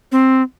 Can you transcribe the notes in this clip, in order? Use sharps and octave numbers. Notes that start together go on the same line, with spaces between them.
C4